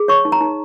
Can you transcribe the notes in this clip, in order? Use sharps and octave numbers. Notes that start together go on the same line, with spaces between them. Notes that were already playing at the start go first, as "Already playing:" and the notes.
Already playing: G#4
C#5 C#6
D#4
A#5
D#4